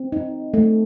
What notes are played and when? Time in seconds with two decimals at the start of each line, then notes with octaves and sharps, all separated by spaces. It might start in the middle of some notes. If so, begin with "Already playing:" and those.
Already playing: C4
0.12 D#4
0.54 A3